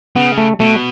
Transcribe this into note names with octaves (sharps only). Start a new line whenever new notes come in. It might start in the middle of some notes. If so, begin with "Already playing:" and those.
C#3 B3
A3
B2 A3